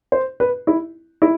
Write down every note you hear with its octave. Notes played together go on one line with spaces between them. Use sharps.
C5
B4
E4
E4